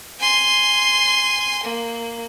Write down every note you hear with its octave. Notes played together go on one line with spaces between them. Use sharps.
G#5 C6
A#3